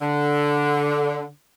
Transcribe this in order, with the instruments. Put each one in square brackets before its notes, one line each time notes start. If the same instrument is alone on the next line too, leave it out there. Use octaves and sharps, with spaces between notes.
[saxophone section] D3